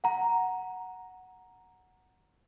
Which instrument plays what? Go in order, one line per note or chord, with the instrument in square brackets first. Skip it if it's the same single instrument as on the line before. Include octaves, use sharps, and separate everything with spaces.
[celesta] F#5 A#5